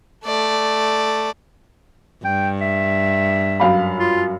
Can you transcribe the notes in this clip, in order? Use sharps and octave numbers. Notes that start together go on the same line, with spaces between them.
A3 D5
G2 G5
E5
F#2 F5 B5
F4